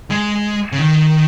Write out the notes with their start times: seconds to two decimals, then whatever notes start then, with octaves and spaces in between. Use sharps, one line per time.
0.10 G#3
0.72 C#3
0.79 D#3